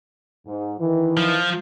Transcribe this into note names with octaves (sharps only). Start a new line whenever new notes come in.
G#2
D#3 E3
F3